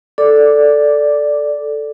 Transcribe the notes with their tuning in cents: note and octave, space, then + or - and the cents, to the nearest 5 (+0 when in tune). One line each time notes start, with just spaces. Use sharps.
A4 +0 D5 +0 D6 +0